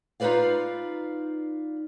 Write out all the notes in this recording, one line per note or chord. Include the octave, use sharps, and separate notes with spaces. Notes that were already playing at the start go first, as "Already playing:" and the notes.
D#4 F4 F#4 B4 D5 F5